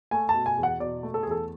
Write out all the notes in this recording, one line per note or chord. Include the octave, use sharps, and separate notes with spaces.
A3 G#5
A5
B2
G#5
E2
F#5
B2 D5
A3
A4
E2 G#4
A4